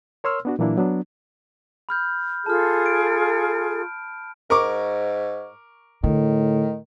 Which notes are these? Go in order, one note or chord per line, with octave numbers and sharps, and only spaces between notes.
A#4 C#5 C6 E6 F6
B3 D4 F#4
A#2 E3 F#3 A#3 D4 E4
F#3 B3 D4
B5 F6 G6
F4 G#4 A4 A5 F6
D7
G#2 A#4 C#6 D6
A2 D3 D#3